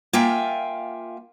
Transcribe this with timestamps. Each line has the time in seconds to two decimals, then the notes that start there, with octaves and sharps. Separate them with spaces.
0.13 A#3 F4 E5 F5 G5 G#5